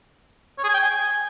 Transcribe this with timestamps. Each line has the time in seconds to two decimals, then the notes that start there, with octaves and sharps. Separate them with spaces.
0.58 C#5
0.64 G#4
0.69 G#5
0.74 G5
0.79 G#5